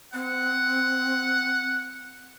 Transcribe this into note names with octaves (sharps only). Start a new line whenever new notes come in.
C4 F#5